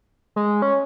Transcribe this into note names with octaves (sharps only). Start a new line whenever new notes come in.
G#3
C#4